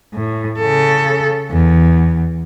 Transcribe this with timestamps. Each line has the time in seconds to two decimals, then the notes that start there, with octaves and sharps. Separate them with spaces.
0.14 A2
0.59 C#3 A4
1.51 E2